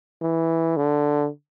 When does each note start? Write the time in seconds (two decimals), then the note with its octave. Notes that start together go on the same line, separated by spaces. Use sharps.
0.21 E3
0.77 D3